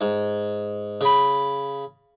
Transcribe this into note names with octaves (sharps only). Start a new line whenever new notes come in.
G#2
C#3 B5